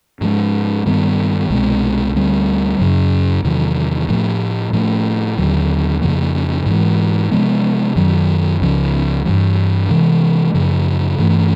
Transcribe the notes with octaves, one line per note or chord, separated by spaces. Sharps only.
G#2 F3 G#3
G2 D#3 G3 B3
C2 B2 G#3 C4
D2 D3 G3 C4
F#2 C#3 F#3
E2 C3 D#3 F#3
A2 F3 A3
A2 F3 A3
D#2 D3 F#3
F2 C#3 F3 A#3
G#2 E3 G#3
C3 F3 G#3 B3
F#2 D#3 F#3
C#2 C#3 F3
G2 E3 G3
C3 E3 G#3
F#2 C#3 F3
G2 E3 A3